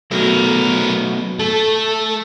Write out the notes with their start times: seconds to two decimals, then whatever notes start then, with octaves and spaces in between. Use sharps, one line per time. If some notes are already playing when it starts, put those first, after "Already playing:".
0.11 B2 F#3 A3 B3 A#4
1.40 A3 A4